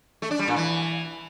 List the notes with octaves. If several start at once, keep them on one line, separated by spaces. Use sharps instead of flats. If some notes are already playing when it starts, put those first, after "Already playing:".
A3
D4
G3
A#2
E3